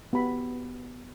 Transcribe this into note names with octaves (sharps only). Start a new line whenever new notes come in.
B3 G4 B5